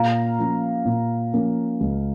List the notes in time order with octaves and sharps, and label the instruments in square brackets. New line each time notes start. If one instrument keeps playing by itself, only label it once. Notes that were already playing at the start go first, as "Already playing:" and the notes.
Already playing: [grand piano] A#2 [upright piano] F5 A#5
[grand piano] F3 A#3 C#4
A#2
F3 A#3 C#4
C#2